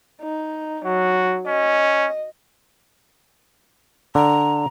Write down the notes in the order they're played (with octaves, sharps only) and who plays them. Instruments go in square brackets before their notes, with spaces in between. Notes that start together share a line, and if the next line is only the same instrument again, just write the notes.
[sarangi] D#4
[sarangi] F#3 [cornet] F#4
[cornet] C#4 [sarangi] D#5
[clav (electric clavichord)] D3 [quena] A#5